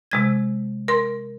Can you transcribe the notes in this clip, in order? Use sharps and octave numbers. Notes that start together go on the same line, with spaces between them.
C3 G#3 G#6
A#4 C6